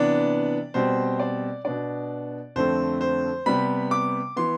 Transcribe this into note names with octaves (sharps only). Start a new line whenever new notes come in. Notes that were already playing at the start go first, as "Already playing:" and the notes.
Already playing: C3 E3 B3 D4 D5
B2 G3 C4 C5
D5
B2 B3 D4 D5
F2 D3 A3 C4 C5
C5
C3 G3 B3 B5
D6
E3 B3 C6